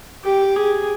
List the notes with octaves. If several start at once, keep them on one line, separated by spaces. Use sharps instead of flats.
G4
G#4